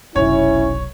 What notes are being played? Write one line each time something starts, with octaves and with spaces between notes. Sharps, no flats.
F1 B1 C#4 E4 C#5